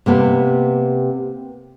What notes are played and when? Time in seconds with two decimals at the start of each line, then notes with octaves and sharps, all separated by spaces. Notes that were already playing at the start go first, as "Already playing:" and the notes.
0.06 C3 A#3 B3